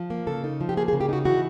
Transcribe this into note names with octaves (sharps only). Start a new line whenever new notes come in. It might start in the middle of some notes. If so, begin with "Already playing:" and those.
Already playing: F3
A#3
C#3 A4
D#4
F3
G4
A#3 G#4
G#4
C#3
G4
D#4 F#4
E3 F#4